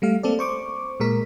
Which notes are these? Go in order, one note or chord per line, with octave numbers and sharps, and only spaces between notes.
G3 A3 F5
A#3 C4 A4 D5
C5 C#6 D6
A#2 G#3 A#4 B6